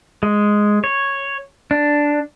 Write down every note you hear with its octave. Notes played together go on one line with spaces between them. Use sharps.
G#3
C#5
D4